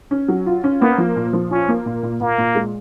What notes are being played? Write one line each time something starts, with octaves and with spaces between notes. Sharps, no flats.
C#4
F#3
F4
C#4
A#3 B3
F3
A#2
F3
C#4 F4
A#3
A#2
A#2
A#2 A#3
A#2
G#3